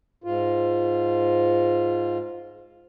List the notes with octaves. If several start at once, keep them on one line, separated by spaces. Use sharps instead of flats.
G#2 F4